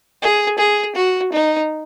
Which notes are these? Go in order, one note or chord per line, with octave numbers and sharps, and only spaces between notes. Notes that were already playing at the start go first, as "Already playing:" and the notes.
G#4
G#4
F#4
D#4